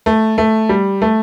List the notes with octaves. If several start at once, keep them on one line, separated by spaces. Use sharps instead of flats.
A3
A3
G3
A3